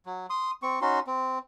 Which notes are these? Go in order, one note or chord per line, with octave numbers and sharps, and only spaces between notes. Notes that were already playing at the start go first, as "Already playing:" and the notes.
F#3
C6 D#6
C4 C#6
C#4 D#4 F#4 C6
C4